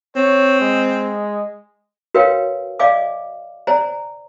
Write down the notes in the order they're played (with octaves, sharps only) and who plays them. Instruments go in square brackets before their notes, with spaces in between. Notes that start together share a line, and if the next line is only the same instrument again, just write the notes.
[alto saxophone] C4 [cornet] C#5
[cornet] G#3
[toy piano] F#4 A#4 B4 C#5 F5 G5
D5 D#5 F5 G#5 D6
C5 D5 G#5 A#5